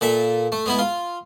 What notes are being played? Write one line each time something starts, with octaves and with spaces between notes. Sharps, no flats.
A#2 A4 E5
A3
G#3 B3 E4
F4